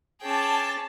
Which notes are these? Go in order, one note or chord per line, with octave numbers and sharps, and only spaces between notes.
C#4 G#4 G5 A5 D6